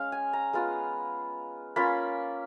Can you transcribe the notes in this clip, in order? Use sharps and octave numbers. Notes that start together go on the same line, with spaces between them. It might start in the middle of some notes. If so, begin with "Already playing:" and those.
Already playing: G#3 C#4 F5
G#5
A#5
G#3 B3 F4
A#3 C#4 F4 B5